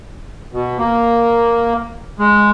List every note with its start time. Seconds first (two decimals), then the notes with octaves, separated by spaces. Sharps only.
0.53 B2
0.79 A#3
2.19 G#3